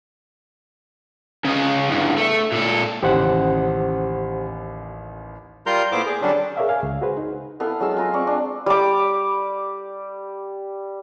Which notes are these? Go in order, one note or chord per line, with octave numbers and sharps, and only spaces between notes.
C#3 D#5
E2 G2
A3
A#2 A4
A1 D#2 C#3 G4 C5 F#5
G3 F4 A#4 A#5 C6 G6
A#2 A3 B3 E4 C5 D6
G#4
D3 F#3 G3 C#4 D4
G#4 A#4 C#5 D5 E5 F5
F5 G#5
C#2
F#4 G#4 B4 C5
D#4
B3 E4 A4 F5
F#3 G#3 F5 E6
F4 A#5
C4 D5 C#6
D4
G3 D6